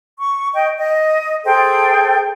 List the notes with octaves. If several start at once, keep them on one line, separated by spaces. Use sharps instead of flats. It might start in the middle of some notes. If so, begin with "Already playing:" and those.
C#6
D#5 G5
D#5
G#4 A4 C5 G5